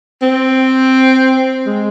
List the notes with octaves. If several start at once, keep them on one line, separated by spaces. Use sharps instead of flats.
C4
G#3